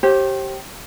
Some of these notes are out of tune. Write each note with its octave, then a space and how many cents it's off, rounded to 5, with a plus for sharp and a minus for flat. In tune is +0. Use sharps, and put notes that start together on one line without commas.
G4 -15 C5 +40